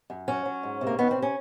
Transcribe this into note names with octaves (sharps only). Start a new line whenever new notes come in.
F#2
F#3 C#4
F#3
G#2
C3
A#3
D#3 B3
C4
C3
C#4